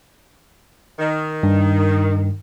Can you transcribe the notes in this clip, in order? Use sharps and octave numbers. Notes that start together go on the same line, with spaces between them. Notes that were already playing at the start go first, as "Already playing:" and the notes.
D#3
G2